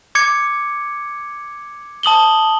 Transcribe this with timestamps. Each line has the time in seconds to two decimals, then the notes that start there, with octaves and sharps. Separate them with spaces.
0.15 D6 G#6 C#7
2.03 A5 D#6 F#7 G7